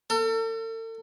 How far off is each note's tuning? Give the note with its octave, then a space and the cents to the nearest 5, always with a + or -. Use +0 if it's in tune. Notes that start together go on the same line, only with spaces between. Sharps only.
A4 +40